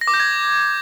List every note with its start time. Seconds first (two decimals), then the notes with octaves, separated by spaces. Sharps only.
0.01 A#6
0.08 D6
0.14 G6
0.20 G#6